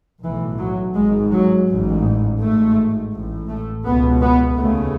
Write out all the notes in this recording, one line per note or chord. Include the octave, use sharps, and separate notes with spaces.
B1 A2 E3
F#3
G#1 G#2 G#3
F#3
A1 G#2
G#1 G#2 A3
A1 A2
A3
C#2 B2 B3
B3
D#2 C#3 A3